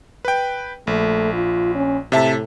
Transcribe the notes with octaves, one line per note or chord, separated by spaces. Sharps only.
B4 G5
A#1 A3
F4
C#4
A2 C3 E5 A5